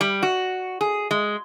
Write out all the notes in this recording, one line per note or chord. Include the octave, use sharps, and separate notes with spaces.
G3
F#4
G#4
G#3